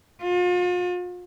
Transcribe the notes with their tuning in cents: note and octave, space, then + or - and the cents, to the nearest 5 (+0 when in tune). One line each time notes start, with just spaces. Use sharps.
F4 +40